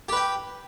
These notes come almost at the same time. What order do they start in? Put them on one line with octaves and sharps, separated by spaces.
G4 B4 G5